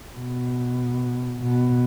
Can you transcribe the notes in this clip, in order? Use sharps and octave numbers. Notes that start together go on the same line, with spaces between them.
B2
B2